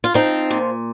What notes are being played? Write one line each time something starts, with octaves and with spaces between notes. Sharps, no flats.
F4
F3 C4 D#4
A#2